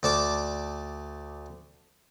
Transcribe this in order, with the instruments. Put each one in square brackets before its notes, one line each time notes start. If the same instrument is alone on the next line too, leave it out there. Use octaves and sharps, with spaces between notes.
[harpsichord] D2 D5 A5 D6